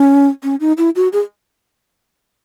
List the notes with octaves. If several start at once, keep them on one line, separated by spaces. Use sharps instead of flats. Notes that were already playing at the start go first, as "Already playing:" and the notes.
Already playing: C#4
C#4
D#4
E4
F#4
G#4